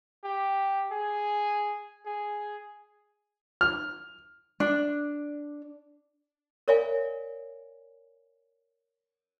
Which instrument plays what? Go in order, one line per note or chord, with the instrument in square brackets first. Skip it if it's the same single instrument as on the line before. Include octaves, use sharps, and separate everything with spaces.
[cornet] G4
G#4
G#4
[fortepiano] F6
[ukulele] D4
[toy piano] A#4 C#5 D5 E5 F5 G#5